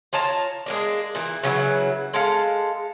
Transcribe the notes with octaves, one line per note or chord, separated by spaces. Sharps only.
F4 C#5 A5 A#5
G#3 A#3 D4
A#2 E3
C#3 E3 F#3
G#3 A4 F5